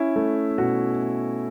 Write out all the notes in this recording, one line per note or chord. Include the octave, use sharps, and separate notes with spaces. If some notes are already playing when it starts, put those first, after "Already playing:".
Already playing: C#4 E4
A3
B2 F#4